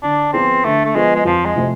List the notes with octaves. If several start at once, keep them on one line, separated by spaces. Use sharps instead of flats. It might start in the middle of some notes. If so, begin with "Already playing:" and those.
D3 D4
F3 B3 C4 F4 G#4
D3 A3
A3
F3 G#3 B3 F4 G#4
G#3
F2 F3
G#3
C3 F3 A3 C4